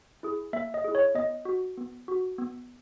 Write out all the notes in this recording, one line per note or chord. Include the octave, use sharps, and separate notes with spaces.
E4 G#4
A#3 E5
D#5
E4 G#4
C#5
B3 D#5
F#4
B3
F#4
B3